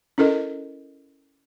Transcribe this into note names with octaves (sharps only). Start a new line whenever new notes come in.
C#4 E4 A4 A#4 D#5